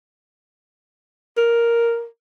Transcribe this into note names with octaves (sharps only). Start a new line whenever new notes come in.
A#4